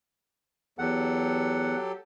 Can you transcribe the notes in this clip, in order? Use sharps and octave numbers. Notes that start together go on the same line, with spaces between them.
E2 F#3 G4 A4 F#5